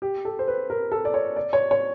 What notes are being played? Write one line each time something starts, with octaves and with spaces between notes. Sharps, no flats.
G4
A4
C5
B4
A#4
A4
D5
C#5
D5
C#5
C#5